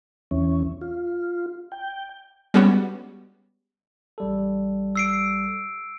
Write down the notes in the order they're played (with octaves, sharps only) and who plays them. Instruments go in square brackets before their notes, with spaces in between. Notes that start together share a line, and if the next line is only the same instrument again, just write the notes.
[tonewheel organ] E2 E3 C#4
F4
G5
[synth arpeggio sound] G3 G#3 B3 C#4 F#4
[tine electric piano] A1 G3 A4
[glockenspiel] E6 C7 D7